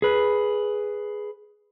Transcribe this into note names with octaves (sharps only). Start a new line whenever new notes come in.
G#4 B4